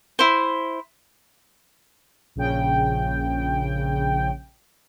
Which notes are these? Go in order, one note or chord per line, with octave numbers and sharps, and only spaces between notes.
E4 C5
A#1 C#3 G5